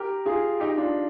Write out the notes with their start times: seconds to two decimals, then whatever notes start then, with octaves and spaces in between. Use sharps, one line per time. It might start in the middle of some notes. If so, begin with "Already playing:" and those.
Already playing: G4 A#4
0.26 F4 G#4
0.60 D#4 G4
0.77 D4 F4